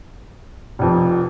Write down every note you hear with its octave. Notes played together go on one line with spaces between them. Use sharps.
F1 F2 F3